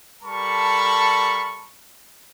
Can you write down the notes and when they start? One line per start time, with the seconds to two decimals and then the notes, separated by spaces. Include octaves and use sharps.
0.23 G3 A4 A#4 A5 B5 C#6